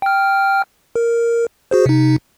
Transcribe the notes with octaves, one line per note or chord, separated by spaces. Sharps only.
G5 F6
A#4
F#4 G#4 C5
C3 D#4